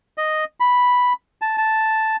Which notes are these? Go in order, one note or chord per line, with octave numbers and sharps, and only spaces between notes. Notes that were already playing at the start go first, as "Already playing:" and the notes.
D#5
B5
A5
A5